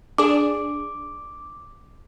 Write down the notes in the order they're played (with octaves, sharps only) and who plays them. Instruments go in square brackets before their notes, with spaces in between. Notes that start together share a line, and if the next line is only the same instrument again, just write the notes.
[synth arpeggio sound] D4 G#4 [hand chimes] D6